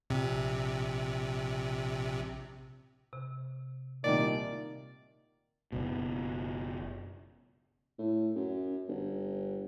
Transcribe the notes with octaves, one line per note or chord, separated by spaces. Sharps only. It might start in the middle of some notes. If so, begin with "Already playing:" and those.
A#1 C3
C3
C2 A#2 D#3 D5
F#1 B2
A2
F#2
G1